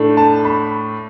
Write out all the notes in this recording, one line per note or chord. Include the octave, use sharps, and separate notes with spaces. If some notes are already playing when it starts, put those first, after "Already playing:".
Already playing: A2 A3 D4
A5
B5